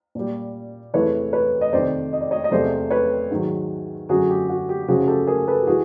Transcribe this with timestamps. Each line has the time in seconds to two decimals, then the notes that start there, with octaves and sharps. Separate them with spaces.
0.15 A#2 G3
0.94 E2 C3 E3 A3 B4 C#5
1.33 B4 C#5
1.61 D#5
1.73 F2 C3 D#3 C5 D5
2.13 D#5
2.21 D5
2.31 C#5 D#5
2.44 D#5
2.51 E2 C3 F3 A3 C5 D5
2.91 B4 C#5
3.31 G#2 D#3 F#3
4.09 F#2 D3 F#3 F#4 G#4
4.29 G4
4.49 F#4
4.69 G4
4.88 F#2 C#3 F3 F#4 G#4
5.08 G4 A4
5.27 G#4 A#4
5.48 A4 B4
5.61 G4
5.67 E3 G#3 F#4 G#4